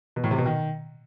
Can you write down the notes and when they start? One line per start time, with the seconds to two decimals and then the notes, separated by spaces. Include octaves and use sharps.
0.16 B2
0.24 A2
0.31 C3
0.38 B2
0.46 D#3